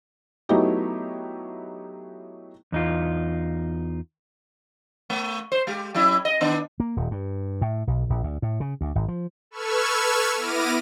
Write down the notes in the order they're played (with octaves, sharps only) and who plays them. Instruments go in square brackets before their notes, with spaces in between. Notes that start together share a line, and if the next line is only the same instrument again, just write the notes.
[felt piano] F#3 A3 B3 D#4 E4 G4
[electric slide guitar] E2 D#4 F4
[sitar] A3
C5
G#3 G4
F#3 C#4 E4
D#5
D#3 B3 D4
[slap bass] A#3
D#1
G2
A2
B1
A#1
D2
A2
C#3
D2
G#1
F3
[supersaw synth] A4 B4 C#6 E6 F6 G#6
B3 E4 D6 F6 A#6 D#7